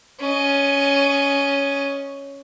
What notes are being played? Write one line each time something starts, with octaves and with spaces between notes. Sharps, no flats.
C#4 D#5